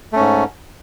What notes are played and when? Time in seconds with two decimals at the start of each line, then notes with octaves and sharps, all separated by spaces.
0.13 A3
0.16 C#4
0.19 G#2